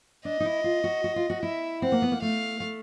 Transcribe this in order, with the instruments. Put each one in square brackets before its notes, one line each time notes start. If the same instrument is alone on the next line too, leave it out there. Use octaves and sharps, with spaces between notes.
[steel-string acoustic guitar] D4 [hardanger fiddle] D#5
[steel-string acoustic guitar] D#4
E4
F4
F#4
F#4
F4
F#4
[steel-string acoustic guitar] E4 [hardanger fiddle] E5
[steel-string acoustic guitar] C4 [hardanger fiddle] F#5
[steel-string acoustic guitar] A#3
B3
A#3
[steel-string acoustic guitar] A3 [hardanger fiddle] F5
[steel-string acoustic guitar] A3